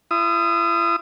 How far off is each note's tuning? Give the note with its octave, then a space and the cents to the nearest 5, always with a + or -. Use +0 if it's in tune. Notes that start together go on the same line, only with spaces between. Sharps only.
E4 +45 D#6 +0